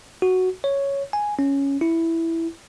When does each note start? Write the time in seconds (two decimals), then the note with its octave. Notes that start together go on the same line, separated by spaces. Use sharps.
0.22 F#4
0.64 C#5
1.13 G#5
1.39 C#4
1.81 E4